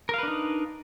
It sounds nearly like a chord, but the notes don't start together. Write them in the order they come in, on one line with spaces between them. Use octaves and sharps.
A#4 F5 B4 D4 D#4